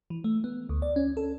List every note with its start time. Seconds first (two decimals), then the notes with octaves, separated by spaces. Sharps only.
0.10 E3
0.24 A3
0.44 B3
0.69 D2
0.82 D5
0.96 C#4
1.17 A4